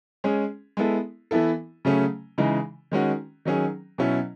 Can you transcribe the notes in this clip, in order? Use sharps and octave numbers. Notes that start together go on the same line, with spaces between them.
G#3 C#4 G#4
G#3 B3 E4 A4
E3 B3 E4 A4
C#3 F#3 A3 C#4 G#4
C#3 E3 G#3 D#4
D#3 G#3 C#4 F#4
D#3 F#3 C#4 G#4
B2 F#3 C#4 E4